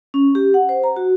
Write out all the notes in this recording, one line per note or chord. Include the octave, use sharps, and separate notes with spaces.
C#4
G4
F#5
C5
A#5
F#4